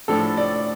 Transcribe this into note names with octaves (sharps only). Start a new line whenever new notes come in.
A2 F3 D4 A4
D5